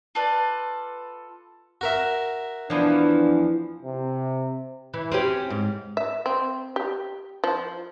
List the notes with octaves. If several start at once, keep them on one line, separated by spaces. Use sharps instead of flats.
F4 A4 B4 D5
F#4 A#4 E5
E2 E3 F3 D4
C3
E3
C4 C#4 G4
G#2
E5
C4
G4
F3